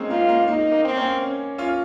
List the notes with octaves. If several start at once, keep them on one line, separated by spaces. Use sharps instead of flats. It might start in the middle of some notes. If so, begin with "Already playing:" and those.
Already playing: G#3 A#3 C4 C#4 D#4
A#3 F4
A#3
A#3 D#4
A#3
C4
A#3 C#4
C#4
C#4 F4